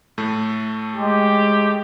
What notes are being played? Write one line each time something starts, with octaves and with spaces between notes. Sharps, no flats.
A2 A3
G#3 G4